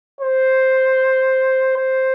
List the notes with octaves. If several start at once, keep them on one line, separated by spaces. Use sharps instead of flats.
C5
C5